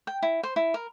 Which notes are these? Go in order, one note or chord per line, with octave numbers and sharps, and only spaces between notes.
G5
E4
C5
E4
A#4